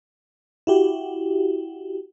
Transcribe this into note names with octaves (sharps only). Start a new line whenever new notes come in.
E4 F#4 G4